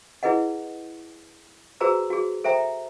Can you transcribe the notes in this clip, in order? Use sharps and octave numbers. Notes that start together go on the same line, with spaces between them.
E4 G#4 B4 D#5 F#5
F#4 G#4 B4 C5 A#5 E6
F#4 G#4
A4 C5 E5 G5 A#5